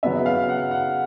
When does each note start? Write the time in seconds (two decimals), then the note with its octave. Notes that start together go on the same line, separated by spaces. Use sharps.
0.03 C#3 F#3 B3 E4 E5
0.26 F5
0.49 F#5
0.71 F#5